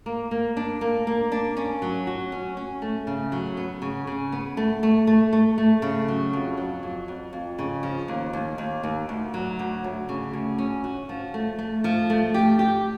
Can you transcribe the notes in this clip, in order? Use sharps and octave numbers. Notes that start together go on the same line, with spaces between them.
A#3
A#3
D4
A#3
A#3
D4
C#4
F#3
F#4
C#4
C#4
A3
C#3
F#3
B3
C#3
C#3
B3
A3
A3
A3
A3
A3
C#3
F#3
F2
F#3
F2
F2
F2
C#3
F3
D#2
D#2
D#2
D#2
D2
F#3
D2
D2
C#3
D2
C#4
F#4
F3
A3
A3
F3
A3
G4
G4